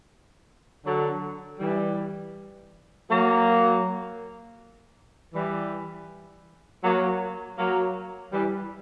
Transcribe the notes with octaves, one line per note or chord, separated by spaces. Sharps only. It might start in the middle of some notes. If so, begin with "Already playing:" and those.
D3 F#3
E3 G3
F#3 A#3
E3 G3
F#3 A#3
F#3 A#3
E3 G3